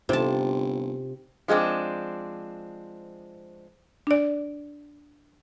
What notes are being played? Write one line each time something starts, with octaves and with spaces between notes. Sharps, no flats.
G1 C3 D#4 F4 C5 A5
F3 G#3 A3 C4 D4
D4 D5